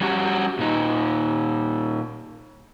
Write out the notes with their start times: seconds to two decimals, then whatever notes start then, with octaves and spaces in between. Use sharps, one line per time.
0.01 G3 C#4 F#4
0.59 A#2 D#4